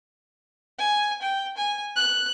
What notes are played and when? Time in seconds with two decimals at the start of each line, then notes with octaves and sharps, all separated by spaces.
0.79 G#5
1.22 G5
1.57 G#5
1.96 F#6